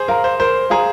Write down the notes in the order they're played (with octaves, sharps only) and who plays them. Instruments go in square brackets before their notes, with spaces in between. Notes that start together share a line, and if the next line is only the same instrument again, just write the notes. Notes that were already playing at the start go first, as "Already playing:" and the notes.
Already playing: [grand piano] G#4 C5
[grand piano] A#4 [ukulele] F5 A#5
[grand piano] C5
[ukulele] A#4 [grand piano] C5
[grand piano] G#4 [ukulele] F5 A#5